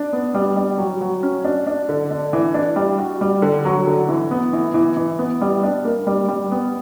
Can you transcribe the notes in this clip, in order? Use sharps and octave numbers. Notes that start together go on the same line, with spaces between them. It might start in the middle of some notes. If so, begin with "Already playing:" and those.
Already playing: D4
B3
G3
G3
F#3
F#3
C#4
D4
D4
D3
D4
E3
D4
G3
F#4
G3
D3
F#3
D3
E3
B3
E3
E3
E3
B3
G3
D4
A#3
G3
G3
B3